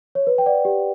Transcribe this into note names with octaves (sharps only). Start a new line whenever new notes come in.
C#5
B4
G5
D5 F#5
G4